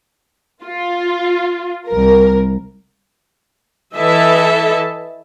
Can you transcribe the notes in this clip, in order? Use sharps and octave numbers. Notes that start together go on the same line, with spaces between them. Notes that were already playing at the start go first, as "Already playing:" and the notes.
F4
C2 A#4
E3 E4 A4 D#5 E5 A5